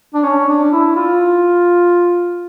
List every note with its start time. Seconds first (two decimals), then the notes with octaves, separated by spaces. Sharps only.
0.14 D4
0.24 C#4
0.48 D4
0.72 E4
0.96 F4